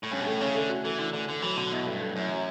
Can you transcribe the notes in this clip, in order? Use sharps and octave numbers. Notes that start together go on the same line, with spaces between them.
A2
G2 C#4
B2
A2 A3
C#3 C#4
D3 A3
F#4
E3 A3
D3 E3
D3 A3
D3 A3
E3 F#3
B2 D3
B2 E4
G2 A3
A3
F#2 E4
F#3